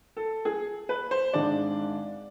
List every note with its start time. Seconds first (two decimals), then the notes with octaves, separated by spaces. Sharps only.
0.17 A4
0.45 G#4
0.89 B4
1.11 C5
1.33 G#1 G#2 G#3 D4 D5